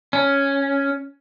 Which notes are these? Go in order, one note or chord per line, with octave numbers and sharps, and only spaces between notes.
C#4